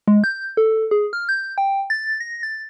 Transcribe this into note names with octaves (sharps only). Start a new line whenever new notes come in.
G#3
G6
A4
G#4
F6
G6
G5
A6
A#6
A6